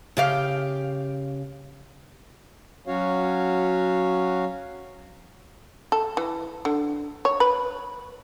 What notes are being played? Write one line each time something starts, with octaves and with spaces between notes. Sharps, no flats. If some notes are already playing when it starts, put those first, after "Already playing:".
C#3 G4 F5
F#3 C#4 F#4 C#5 F5
A4
E3
D3
C#5
B4